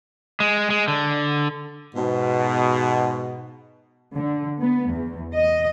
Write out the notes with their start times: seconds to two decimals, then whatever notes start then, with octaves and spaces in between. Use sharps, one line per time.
0.40 G#3
0.70 G#3
0.88 D3
1.94 G#2 B2
4.13 D3
4.60 B3
4.91 E2
5.33 D#5